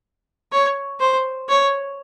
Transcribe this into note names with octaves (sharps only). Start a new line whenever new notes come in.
C#5
C5
C#5